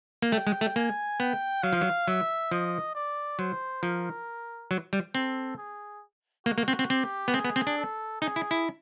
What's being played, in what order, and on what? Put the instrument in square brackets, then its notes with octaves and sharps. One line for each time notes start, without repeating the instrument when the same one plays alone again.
[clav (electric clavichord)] A#3
[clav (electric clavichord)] A3 [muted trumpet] G5
[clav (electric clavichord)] G#3
A3
[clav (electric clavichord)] A#3 [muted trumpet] G#5
[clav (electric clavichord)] B3 [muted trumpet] G5
[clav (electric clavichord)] F#3 [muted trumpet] F5
[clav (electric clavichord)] F3
F#3
[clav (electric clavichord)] F#3 [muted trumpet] E5
[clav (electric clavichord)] F3 [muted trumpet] D#5
[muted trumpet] D5
[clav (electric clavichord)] F#3 [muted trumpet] C5
[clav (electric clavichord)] F3 [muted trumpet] A#4
[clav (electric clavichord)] F#3
G3
[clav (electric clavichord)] C4 [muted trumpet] A4
[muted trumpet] G#4
[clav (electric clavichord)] A#3 [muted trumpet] F#4
[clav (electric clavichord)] A#3
C4
C4
[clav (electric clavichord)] C4 [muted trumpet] G4
[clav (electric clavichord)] B3
[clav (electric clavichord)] C4 [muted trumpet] G#4
[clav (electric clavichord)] B3
C4
D4
[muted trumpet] A4
[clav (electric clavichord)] D#4 [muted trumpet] G#4
[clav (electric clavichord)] E4
E4